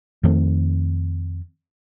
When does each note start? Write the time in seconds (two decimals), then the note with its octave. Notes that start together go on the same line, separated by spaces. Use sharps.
0.23 F2 D#3 A3 C4